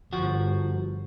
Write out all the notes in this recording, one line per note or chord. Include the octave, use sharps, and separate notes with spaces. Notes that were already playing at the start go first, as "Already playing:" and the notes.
G1 F3 F#4